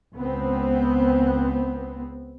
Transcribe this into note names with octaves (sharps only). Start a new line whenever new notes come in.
C#2 B3 C4